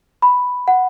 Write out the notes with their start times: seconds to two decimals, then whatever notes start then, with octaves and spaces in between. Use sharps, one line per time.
0.22 B5
0.68 F#5